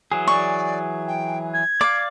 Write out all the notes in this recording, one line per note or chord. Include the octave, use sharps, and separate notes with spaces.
E3 F#3 G#4
D5 C#6
G5
G#6
D5 F5 D6